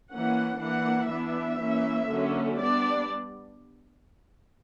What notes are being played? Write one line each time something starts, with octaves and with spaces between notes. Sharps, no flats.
E3 A#3 C#4 F#5
E3 A#3 D4 F#5
E3 B3 D4 E5
E3 A#3 C#4
D3 F#3 A#3 C#4
G3 B3 D4 D5